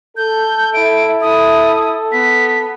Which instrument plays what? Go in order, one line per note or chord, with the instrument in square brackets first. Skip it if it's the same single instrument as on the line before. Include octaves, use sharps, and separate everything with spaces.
[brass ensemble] A4 [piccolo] G6
[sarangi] E4 [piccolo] D7
[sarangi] E4 [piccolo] D#6
[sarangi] B3 [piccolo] B6